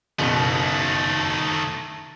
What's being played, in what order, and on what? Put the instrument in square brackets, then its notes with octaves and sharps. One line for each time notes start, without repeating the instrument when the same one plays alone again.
[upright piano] F#1 B2 [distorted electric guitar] D#3 A3